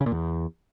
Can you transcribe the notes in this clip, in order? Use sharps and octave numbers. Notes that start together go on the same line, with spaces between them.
C#3
A#2
E2